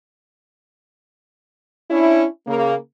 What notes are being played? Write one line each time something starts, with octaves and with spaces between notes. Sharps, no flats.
C#4 D4 E4
C#3 A#3